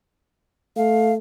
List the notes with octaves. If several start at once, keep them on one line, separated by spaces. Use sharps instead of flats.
A3 F5